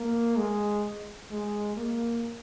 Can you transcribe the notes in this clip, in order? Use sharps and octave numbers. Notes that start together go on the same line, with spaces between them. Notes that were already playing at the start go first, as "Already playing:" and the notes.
Already playing: A#3
G#3
G#3
A#3